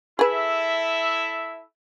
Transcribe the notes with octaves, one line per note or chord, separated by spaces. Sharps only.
E4 G#4 A4 B4 E5